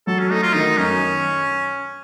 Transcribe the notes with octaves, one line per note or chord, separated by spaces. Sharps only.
F#3 A4
C#4
A3 D#4
F4
D#3 D#4
F#2 C#4